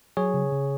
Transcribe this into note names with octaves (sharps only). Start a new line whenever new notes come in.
F#3 G#4 C#5
C#3
C#3